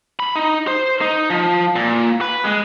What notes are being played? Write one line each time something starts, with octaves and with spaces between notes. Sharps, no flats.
B5
D#4
C5
D#4
F3
A#2
B4
G#3